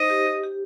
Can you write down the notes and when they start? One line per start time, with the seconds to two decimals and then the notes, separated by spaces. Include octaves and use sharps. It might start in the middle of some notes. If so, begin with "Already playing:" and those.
Already playing: D#4 C5 D#5
0.10 G4
0.26 G4
0.44 G4